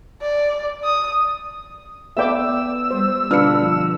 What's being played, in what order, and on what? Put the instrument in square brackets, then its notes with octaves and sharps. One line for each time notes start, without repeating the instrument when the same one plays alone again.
[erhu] D5
D#6
[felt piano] B3 B4 D5 [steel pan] E5 G5 D6 [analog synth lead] E6
[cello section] G3 [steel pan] C5
[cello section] B2 D3 [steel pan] D4 F4 B4 [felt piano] F6 C#7
[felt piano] F3